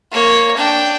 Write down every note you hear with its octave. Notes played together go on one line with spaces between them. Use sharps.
A#3 C#5
D4 G5